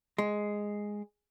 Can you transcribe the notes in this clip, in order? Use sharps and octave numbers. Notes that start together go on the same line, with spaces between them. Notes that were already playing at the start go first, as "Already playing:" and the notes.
G#3